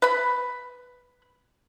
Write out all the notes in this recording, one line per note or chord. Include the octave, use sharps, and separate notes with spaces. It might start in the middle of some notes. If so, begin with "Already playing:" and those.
B4 B5